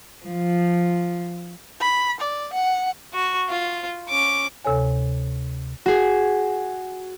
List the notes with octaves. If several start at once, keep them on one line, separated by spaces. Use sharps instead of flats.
F3
B5
D5
F#5
F#4
F4
C#4 D6
D2 C3 A4 C#5 G#5
F#4 G#4